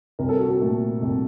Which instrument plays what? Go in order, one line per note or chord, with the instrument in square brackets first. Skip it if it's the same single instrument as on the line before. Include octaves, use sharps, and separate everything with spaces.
[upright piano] C2 A#4
A4
F#4
A4
A#2 A3
C2